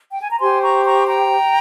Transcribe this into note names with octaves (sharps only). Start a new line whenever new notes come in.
G5
G#5
A#5
G4 C5 G#5 C6
A#5 C#6
A#5 C#6
G5 A#5